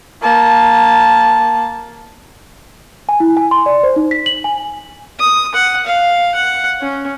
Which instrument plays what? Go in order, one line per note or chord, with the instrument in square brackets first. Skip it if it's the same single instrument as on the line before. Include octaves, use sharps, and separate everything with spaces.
[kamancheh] A#3 A5
[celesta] G#5
E4
G#5
C6
D5
C5
D#4
B6
F#7
G#5
[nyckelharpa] D#6
F#5
F5
F#5
C#4